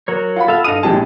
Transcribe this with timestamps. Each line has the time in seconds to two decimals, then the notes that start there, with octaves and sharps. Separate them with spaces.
0.08 F#3 A#4 C#5
0.36 F4 F#5 B5
0.48 A4 E5 F5
0.64 G2 A4 D#5 F5 D#6 D#7
0.83 A#1 G#3 C4 E4 G4 A5